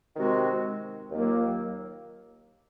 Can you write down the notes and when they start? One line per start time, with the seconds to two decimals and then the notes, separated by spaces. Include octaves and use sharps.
0.16 C3 D#3 G#3 C4 F#4
1.11 D#2 D#3 F#3 A#3 F4